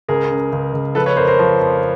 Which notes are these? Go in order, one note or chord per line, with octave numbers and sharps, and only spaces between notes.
C#2 G#4 A#4
C#3
C#2
C#2
F3 A4 B4
B4 C#5
F2 A#4 C5
A#4 C5
F3
F2